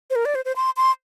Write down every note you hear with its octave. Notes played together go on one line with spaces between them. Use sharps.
C5
A#4
D5
C5
C5
C6
C6